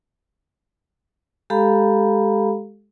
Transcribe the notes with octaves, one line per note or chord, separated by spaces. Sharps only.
G#3 G4 A4 F5 A#5 B5